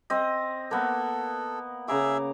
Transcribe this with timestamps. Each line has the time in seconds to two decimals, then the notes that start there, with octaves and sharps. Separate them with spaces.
0.10 C4 D#5
0.71 A#3 B3 A4
1.88 C#3 G#4 E5 A#5 D6